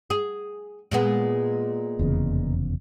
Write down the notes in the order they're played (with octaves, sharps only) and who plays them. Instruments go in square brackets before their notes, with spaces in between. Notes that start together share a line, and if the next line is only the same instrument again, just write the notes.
[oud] G#4
A#2 G#3 B3
[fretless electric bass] F1 E2 C#3